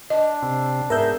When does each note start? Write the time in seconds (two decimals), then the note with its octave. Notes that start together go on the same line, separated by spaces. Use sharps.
0.10 D4 D#5
0.42 C3 C4
0.90 G#2 B3 G#4 A#4 E5 G6